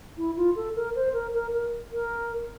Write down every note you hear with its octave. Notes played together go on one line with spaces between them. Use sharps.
E4
F4
A4
A#4
C5
A#4
A#4
A#4
A#4